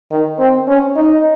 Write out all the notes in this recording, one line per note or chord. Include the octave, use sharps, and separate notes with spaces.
D#3
C4
C#4
D#4